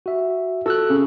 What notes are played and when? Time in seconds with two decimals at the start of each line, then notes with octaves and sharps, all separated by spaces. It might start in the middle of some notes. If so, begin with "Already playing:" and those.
0.06 F#4 E5
0.66 F#4 A4 E6 F#6
0.90 C#3